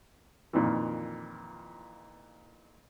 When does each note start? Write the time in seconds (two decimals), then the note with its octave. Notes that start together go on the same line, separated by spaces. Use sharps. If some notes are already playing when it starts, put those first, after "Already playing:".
0.53 F2 A#2 D#3 E3